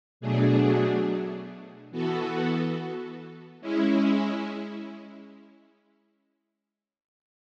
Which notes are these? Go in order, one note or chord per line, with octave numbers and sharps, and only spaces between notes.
B2 F#3 A3 D4 G#4
E3 B3 F#4 A4
G#3 C#4 E4